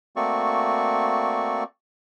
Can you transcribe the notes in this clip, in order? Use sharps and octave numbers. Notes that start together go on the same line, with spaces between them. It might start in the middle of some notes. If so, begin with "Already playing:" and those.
A3 A#3 C4 F#4 D5 C#6